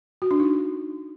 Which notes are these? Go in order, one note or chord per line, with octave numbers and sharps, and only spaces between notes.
F#4
D4
D#4